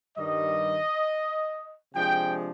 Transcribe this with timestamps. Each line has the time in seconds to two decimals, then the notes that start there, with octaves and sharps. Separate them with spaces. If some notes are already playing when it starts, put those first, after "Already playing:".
0.16 G2 D#3 G3 D#5
1.93 C3 F3 G#3 D4 G5